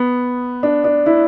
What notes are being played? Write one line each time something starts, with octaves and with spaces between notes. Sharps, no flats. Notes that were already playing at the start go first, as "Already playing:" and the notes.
Already playing: B3
D4
D4
E4